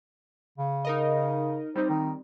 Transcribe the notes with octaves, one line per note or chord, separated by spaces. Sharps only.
C#3
D#4 A#4 D#5
G3 C4 D#4 C5
D#3